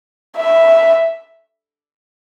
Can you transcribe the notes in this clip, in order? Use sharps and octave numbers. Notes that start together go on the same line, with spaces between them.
E5